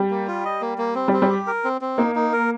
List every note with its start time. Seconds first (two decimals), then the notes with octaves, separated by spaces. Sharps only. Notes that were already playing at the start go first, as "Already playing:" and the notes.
Already playing: G3
0.10 A#3
0.27 F4
0.45 D#5
0.61 A#3
0.78 A#3
0.95 C4
1.08 G3 C4
1.22 G3
1.29 G4
1.47 A#4
1.64 C4
1.81 C4
1.97 A#3 D#4
2.15 D#4
2.33 A#4